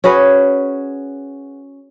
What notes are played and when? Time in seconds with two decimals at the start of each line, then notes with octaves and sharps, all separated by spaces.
0.04 C#4 F#4 G#4 B4